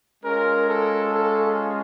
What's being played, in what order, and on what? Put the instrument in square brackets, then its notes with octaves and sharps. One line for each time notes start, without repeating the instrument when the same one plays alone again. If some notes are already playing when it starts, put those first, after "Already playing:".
[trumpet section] G#3 C#4 F4 A#4
A4
A4